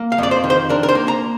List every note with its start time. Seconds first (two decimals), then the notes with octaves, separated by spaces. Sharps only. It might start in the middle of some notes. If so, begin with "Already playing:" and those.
Already playing: A#3
0.12 F5
0.18 F2 D5
0.31 C5
0.44 D#3
0.50 C5
0.69 D4 A#4
0.83 A#4
0.89 C5
0.95 A#3
1.08 A#5